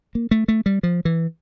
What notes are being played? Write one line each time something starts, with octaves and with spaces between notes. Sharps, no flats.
A#3
A3
A3
G3
F3
E3